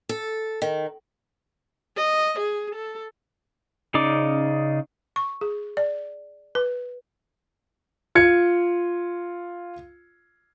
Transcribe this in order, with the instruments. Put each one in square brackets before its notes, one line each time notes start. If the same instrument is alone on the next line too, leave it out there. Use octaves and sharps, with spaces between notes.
[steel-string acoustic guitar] A4
D#3
[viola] D#5
G#4
A4
[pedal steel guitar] C#3 C#4 D#4 D5 D6
[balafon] C#6
G#4
D5
B4
[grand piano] F4 G#6 C#7